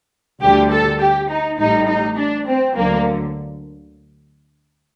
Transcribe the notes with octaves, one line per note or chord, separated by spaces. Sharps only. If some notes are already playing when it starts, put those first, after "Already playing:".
D2 D3 G3 G4
A4
G4
D#4
A1 A2 G3 D#4
D#4
D4
C4
D2 D3 F#3 A#3